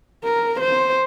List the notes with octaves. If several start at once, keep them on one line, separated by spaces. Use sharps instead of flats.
A#4
C5